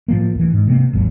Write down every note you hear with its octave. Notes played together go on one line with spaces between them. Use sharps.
A2 F3 A#3
D2 E3
G#2
C3 A3 A#3
G#1 D#2 F#3